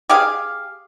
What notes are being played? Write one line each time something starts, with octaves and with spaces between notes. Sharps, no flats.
G4 G#4 F5